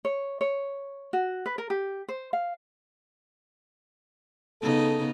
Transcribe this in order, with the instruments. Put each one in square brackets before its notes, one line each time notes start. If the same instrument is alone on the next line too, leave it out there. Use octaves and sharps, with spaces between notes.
[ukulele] C#5
C#5
F#4
B4
A#4
G4
C5
F5
[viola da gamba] C#3 B3 D#4 [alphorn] A4